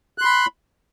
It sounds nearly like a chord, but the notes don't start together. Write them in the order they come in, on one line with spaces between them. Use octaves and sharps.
F#6 C6 B5